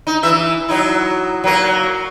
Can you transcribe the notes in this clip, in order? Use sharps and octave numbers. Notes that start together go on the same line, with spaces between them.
D#4
E3 E5
F#3 D#4 E4
F#3 A#3 A#4